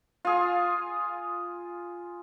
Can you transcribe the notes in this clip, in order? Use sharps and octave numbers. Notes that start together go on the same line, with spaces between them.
F4 G#4